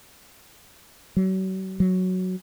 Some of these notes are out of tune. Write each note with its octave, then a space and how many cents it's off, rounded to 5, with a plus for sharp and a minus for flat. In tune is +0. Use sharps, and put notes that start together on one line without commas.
F#3 +40
F#3 +0